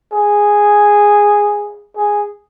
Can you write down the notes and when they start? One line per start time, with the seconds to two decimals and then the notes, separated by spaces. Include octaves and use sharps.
0.12 G#4
1.95 G#4